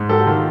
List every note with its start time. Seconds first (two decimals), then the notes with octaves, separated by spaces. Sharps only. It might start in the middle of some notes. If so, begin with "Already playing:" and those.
Already playing: G#2
0.09 F#3 G4 A4
0.27 D#3 F4